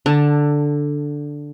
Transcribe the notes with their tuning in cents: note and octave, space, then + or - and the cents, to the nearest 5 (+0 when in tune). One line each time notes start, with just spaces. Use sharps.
D3 +0 A5 +20